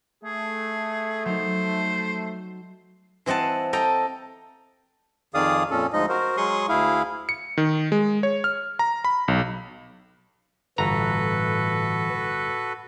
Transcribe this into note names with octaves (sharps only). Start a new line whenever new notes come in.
A3 G#4
F#3 D#4 C5
E3 C4 D#5 F#5 A5
A4 D#5 G5 A#5
F2 D#3 G#4 D5 F5 D#6
F2 A#2 C#4 A4
D2 F3 G#3 D#4 D#5
F#4 A#4 C5
F#3 G#3 G#4 C6 C#6 D#6
D2 E4 G#4 F5
C#7
D#3
G#3
C#5
F6
A#5
B5
B1
G1 A2 E3 F#4 A4 B4 A#5